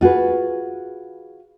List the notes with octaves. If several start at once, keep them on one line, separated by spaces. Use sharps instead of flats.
F4 F#4 G#4 B4